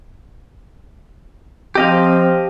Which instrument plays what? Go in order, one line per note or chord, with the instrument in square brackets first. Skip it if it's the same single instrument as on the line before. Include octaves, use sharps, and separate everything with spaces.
[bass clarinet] F3 [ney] C4 [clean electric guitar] G4 D#5 F5